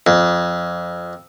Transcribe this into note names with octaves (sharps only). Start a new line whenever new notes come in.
F2